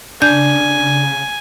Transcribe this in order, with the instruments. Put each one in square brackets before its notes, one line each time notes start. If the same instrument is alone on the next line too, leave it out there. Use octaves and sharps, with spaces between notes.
[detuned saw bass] C#3 [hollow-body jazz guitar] D4 [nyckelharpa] G#5 [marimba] G6